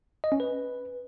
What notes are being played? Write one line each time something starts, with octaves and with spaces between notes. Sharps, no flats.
D#5
C#4
B4